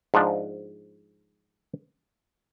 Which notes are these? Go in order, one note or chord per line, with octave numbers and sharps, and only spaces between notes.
G#2 F3 D4